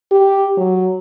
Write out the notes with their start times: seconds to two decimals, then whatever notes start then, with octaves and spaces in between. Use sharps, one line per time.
0.11 G4
0.57 F#3